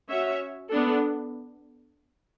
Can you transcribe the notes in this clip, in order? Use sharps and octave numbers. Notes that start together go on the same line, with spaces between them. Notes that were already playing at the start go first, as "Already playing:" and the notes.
C#4 F#4 C#5 E5
B3 D4 A4